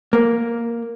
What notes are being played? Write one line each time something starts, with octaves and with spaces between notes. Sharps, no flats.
A#3